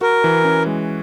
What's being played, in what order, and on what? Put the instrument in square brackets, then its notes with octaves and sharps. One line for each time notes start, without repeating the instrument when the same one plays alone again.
[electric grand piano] F#4 [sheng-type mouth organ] A#4
[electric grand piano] E3
C#4
G#3